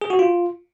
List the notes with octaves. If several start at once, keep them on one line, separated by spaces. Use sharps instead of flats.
G#4
F#4
F4